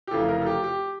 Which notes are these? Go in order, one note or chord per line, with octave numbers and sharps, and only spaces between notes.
G4
F1 F2 C#3 E3 A4
A#4
A4
G4
G4